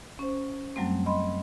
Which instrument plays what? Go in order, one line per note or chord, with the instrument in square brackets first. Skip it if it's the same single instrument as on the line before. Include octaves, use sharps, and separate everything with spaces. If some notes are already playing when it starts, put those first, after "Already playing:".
[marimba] C#4 C5
F#2 F#3 G3 A3 C4
D#5 B5 C6